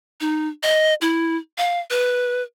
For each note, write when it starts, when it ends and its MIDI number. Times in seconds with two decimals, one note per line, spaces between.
0.21 0.48 63
0.63 0.94 75
1.01 1.37 64
1.58 1.80 77
1.90 2.42 71